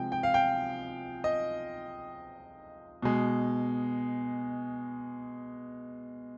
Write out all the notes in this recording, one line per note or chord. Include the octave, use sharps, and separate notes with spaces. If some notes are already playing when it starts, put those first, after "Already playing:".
Already playing: C3 F3 G#3 G5
G5
F5
G5
D#5
B2 G#3